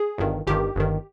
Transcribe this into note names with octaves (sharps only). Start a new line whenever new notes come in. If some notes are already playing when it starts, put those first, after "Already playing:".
Already playing: G#4
G1 G2 D#3
G1 G2 D#3 G4
G1 G2 D#3